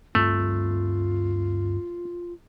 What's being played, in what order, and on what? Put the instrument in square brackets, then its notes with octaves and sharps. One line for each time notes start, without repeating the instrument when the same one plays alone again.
[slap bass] D2 G2 C4 [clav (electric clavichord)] A3 [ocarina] F4